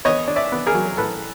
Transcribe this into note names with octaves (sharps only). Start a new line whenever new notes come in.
B3 C#5 D#5
D4
D5 E5
B3
G#4 A#4
F#3
A2 A4 B4